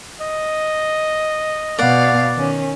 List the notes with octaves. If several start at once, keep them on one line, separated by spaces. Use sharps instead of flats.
D#5
B2 D5 F5 F#5
D#3 C#4